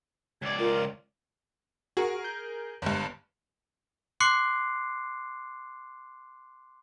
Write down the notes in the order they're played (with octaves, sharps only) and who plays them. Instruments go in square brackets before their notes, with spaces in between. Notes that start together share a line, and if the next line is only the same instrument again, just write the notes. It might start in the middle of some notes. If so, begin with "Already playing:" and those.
[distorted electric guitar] C#2 D5 [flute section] G#6
[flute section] F4 A#4
[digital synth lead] F#4 [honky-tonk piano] G#4 A#4
[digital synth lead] G6
[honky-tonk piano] G1 G2
[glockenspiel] C6 D6 F#6 C7 C#7